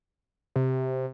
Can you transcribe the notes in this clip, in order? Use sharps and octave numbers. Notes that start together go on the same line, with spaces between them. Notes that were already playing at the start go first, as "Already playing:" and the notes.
C3